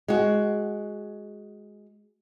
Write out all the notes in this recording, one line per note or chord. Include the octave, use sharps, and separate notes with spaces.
G#3 F#4